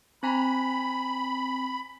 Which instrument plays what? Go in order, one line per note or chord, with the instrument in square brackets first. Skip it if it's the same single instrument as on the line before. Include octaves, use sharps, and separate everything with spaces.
[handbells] C4 G#5 A#5 [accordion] B5